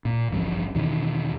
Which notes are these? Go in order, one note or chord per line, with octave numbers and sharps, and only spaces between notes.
A#2
D1 A1 G2 F3
E2 B2 D#3